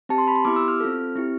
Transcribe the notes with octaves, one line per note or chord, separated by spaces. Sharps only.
C4 G4 A5
C6
B5
C6
B3 E4 G4 D6
E6
F6
C4 F4 A4
C4 E4 G4